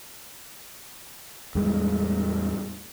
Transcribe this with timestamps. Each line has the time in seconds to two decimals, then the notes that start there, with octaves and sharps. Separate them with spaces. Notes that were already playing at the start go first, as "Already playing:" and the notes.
1.55 E2 A2 G3 G#3